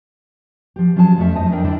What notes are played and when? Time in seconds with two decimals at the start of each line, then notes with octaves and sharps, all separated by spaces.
0.76 F3 G4
0.96 F3 F#3 C#4 G#4 D#5 A5
1.18 F2 A3 C#4 C#5 E5
1.35 F#2 D#4 D#5 A5
1.51 C4 D4 A#4 G5
1.64 D3 C4 D4 E4 D5 G5